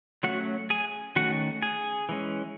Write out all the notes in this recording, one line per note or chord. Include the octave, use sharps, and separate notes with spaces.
F#3 A3 C#4 F#4 F#5
G#4 G#5
D#3 A3 C#4 F#4 F#5
G#4 G#5
E3 G#3 C#4